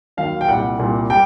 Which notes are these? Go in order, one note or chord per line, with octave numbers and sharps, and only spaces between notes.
D#2 D#3 F#3 F5
G5
C2 A#2 G3 F#5
C2 A#2 G3
G3 G5